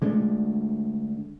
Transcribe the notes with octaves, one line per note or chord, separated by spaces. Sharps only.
D3 G#3 A3 D4